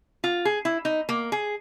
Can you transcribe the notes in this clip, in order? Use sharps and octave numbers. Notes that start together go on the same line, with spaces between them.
F4
G#4
E4
D#4
A#3
G#4